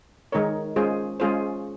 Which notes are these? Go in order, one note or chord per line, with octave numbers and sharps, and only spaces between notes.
D#3 G#3 D#4 A#4 C#5
G#3 C#4 F4 G#4 C5
G#3 C#4 F4 G#4 C5